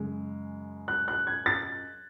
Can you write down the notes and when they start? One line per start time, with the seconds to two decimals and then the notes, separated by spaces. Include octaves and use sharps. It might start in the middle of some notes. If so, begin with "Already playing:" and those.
Already playing: F#2 C#3 G#3
0.88 F#6
1.08 F#6
1.27 G#6
1.46 A6